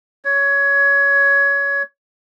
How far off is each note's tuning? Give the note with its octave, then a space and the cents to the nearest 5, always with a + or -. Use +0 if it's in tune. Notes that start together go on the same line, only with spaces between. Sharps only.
C#5 +15